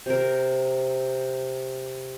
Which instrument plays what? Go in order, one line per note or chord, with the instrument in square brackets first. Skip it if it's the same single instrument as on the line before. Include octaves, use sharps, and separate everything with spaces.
[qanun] C3 A#4